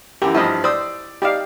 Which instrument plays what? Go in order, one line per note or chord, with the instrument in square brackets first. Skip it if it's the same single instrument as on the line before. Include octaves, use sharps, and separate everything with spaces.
[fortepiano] F#2 E3 [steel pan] G4
[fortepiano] G2 F3 A5 [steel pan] E4 D#5
[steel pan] C5 [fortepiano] D5 D#6 E6
[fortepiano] D#4 D5 [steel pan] G4 F5